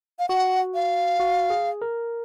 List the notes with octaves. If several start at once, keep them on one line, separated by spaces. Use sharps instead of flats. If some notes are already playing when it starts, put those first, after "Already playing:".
F5
F#4 F#5
F5
F#4
G#4
A#4